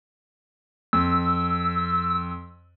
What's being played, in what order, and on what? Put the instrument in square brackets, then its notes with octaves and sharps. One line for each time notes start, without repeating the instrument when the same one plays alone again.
[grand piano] F2 [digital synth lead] E6